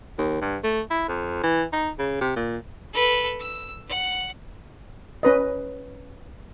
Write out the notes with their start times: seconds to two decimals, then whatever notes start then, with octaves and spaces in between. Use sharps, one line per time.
0.18 D#2
0.41 G2
0.64 A3
0.91 E4
1.08 F2
1.43 E3
1.72 D#4
1.99 C#3
2.21 C3
2.36 A#2
2.93 A4 B4
3.39 E6
3.88 F#5
5.23 C#4 B4 D#5